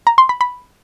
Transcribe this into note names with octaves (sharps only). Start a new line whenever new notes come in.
A#5
C6
B5
B5